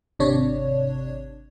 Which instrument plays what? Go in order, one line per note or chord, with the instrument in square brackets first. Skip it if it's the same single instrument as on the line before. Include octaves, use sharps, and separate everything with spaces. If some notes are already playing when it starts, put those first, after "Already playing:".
[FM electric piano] G#1 C3 D4 C#5